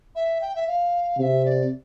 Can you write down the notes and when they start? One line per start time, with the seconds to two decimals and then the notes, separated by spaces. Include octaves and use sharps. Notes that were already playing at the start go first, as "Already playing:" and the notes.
0.15 E5
0.40 G5
0.55 E5
0.67 F5
1.18 C3 E5 F5
1.44 D5